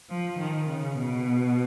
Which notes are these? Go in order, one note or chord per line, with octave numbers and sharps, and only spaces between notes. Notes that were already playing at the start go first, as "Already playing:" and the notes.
F3
D#3
C#3
B2